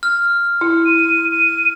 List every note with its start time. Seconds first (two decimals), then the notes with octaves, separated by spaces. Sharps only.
0.03 F6
0.61 E4
0.85 D#7
1.31 D#7